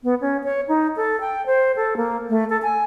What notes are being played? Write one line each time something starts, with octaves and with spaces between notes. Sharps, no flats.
B3
C#4
C#5
D#4
A4
G5
C5
A4
A#3
A3
A4
G#5